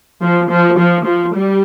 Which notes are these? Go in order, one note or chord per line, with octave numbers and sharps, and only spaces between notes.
F3
F3
F3
F3
G3